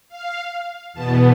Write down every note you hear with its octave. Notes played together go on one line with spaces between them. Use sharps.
F5
E2 B2 B3 A5